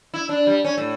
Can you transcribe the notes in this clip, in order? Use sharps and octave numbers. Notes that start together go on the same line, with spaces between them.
E4
D4
G3
C#4
A2